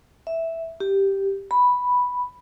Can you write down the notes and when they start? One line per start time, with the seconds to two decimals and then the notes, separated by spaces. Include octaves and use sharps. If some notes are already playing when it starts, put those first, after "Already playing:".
0.27 E5
0.80 G4
1.51 B5